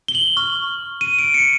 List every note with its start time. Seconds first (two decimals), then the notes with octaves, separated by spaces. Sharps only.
0.08 G7
0.15 F#7
0.37 C#6 F6
1.01 D#7
1.19 D7
1.34 C#7